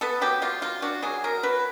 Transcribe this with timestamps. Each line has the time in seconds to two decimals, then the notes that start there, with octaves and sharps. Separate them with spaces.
0.01 B3 A4
0.21 F#3 G4
0.42 F#3 F4
0.62 F#3 F4
0.82 D4 F#4
1.03 F#3 G#4
1.24 F#3 A#4
1.43 F#3 B4